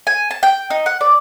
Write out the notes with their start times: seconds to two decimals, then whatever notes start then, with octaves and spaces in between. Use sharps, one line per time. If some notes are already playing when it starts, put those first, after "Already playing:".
0.07 G#5
0.31 A5
0.43 G5
0.70 D#4
0.86 F#5
1.01 D5